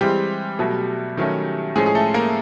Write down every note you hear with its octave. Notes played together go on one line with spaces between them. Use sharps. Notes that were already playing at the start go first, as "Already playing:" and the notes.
E3 G3 G#3 C4 G4
B2 F#3 A3
D#3 F#3 A3 C#4
A2 F3 G#3 C#4 G#4
G#4
A3 A4
A#3 A#4